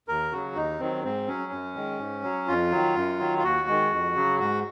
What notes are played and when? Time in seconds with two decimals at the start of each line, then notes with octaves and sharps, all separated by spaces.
0.08 D#2 A#4
0.32 C#3 F#3 F#4
0.55 D#2 D#4
0.80 D#3 F#3 C4
1.03 G#2 C4
1.28 F#3 C#4
1.52 F#2
1.75 D#3 G#3
1.99 G#2
2.23 F#3
2.47 F2 F4
2.71 D#3 F#3
2.96 F#2
3.19 D#3 F#3
3.38 F4
3.44 D#2 F#4
3.68 D#3 G#3
3.91 F2
4.15 C#3 F#3
4.39 G#2 F#4